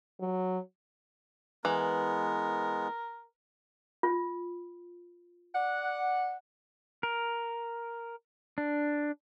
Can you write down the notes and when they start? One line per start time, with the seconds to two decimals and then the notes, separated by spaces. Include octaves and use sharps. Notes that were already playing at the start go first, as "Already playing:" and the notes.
0.20 F#3
1.65 E3 G#3 B3 A#4
4.03 F4
5.55 D5 F#5
7.03 A#4
8.58 D4